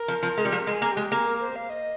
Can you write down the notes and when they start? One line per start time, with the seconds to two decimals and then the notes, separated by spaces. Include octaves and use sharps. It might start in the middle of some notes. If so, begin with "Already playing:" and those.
Already playing: A#4
0.08 F3
0.23 F3
0.38 G#3
0.45 G3
0.52 F3 A#4
0.67 G#3
0.72 G#4
0.82 A#3
0.91 G4
0.97 G#3
1.11 A#3 G#4
1.26 A#4
1.41 C5
1.56 F5
1.70 D#5